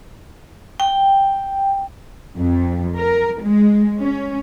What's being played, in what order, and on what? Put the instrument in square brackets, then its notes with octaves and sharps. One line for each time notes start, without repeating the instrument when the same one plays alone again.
[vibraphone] G5
[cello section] F2
A#4
G#3
C#4